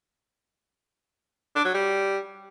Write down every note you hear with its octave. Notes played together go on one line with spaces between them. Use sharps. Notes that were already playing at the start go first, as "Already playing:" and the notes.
D4
F#3
G3